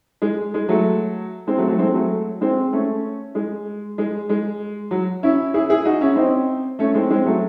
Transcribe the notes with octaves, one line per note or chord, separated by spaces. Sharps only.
G#3
G#3
F#3 A3
G#3 C4
F#3 A3
F#3 A3
G#3 C4
F#3 A3
G#3 C4
A3 C#4
G#3
G#3
G#3
F#3
C#4 E4
E4 G#4
E4 G#4
D#4 F#4
C#4 E4
C4 D#4
A3 C#4
G#3 C4
G#3 C4
F#3 A3